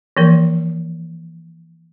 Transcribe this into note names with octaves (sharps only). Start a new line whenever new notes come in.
E3 F3 A#3 A#4